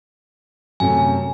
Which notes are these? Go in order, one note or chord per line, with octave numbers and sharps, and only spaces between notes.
F#2 C3 A3 G#5